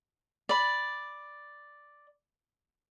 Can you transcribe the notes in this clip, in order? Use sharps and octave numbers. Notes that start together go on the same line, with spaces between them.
D5 B5